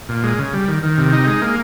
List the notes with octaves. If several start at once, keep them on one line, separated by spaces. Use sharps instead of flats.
A#2
G#3
C#3
G3
D#3
D#3
C3
D#4
G#3
A#3